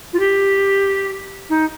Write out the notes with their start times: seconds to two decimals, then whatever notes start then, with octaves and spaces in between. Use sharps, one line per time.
0.13 F4
0.19 G4
1.49 D#4